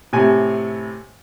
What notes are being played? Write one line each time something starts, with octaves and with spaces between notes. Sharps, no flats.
A2 C3 G#5